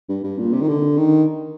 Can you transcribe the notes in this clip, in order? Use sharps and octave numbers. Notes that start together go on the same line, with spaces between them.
G2
G2
A#2
C3
D#3
D3
D#3